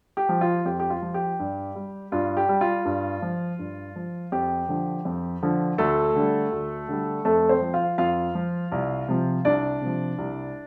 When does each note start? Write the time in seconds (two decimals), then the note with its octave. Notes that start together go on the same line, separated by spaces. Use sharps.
0.17 G4
0.29 F3
0.41 F4
0.65 F2 G4
0.79 G4
0.90 F4
1.02 F3
1.14 G4
1.39 G2
1.75 G3
2.12 G2 F4
2.37 G4
2.49 G3
2.61 F4
2.85 G2
3.22 F3
3.59 G2
3.96 F3
4.32 F2 G4
4.69 D3 F3
5.05 F2
5.42 D3 F3
5.78 D2 A3 A4
6.15 D3 G3
6.52 D2
6.88 D3 G3
7.25 F2 A3 A4
7.49 C4 C5
7.61 F3
7.74 F4 F5
7.98 F2 F4 F5
8.35 F3
8.72 C2
9.08 C3 F3
9.45 C2 D4 D5
9.81 C3 F3
10.18 C2